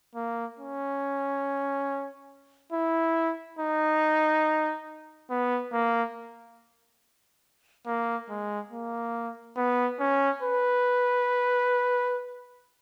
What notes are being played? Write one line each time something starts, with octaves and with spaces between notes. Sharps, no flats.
A#3
C#4
E4
D#4
B3
A#3
A#3
G#3
A#3
B3
C#4
B4